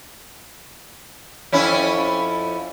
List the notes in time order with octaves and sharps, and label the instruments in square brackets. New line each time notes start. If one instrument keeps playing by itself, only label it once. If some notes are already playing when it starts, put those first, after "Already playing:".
[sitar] F2 C#4 E4